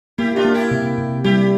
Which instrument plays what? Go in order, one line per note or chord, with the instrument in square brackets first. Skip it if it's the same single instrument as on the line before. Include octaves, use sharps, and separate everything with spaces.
[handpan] A#3 [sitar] E4 G4
[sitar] D4 F4
[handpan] A#3
[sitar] E4 G4
[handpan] C3
C3
[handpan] G3 [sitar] E4 G4